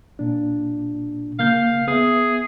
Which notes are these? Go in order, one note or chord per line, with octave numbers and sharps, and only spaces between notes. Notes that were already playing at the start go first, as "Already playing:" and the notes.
A#2 D4
C#3 A#3 F5 G6
B3 G#4 E5